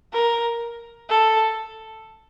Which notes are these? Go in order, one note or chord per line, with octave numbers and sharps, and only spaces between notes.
A#4
A4